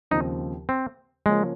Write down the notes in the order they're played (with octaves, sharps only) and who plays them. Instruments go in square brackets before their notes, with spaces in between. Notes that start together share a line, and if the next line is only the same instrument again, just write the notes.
[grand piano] D#2 C#3 F3 C4 [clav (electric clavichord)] D#4
[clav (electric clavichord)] C4
[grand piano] C#3 F3 A#3 C#4 F4 [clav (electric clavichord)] G#3